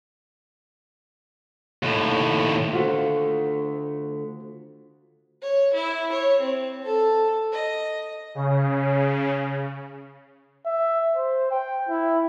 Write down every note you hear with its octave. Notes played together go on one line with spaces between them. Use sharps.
D#2 A2
D3 A3 F4 F#4 C5
C#5
E4
C#5
C4
A4
D#5
C#3
E5
C5
G5
E4